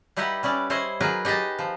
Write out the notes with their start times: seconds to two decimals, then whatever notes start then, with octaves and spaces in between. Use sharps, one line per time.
0.16 G3 D#4 E4 G4 B4 F#5
0.43 G3 C#4 E4 D5
0.70 E4 C5 C#5 D#5
1.00 F#3 D#4 G#4 A#4 B4
1.25 D#4 G4 G#4 D#5 A5
1.59 F3